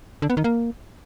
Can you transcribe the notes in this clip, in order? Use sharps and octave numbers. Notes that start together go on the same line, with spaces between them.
D3
B3
D#3
A#3